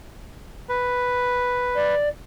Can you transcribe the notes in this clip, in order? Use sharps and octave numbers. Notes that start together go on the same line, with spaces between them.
B4
D5